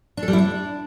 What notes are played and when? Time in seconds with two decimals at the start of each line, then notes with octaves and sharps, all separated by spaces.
0.17 D4
0.23 A4
0.28 G3
0.33 E4
0.38 D4